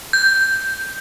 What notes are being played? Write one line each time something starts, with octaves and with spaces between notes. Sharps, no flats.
G6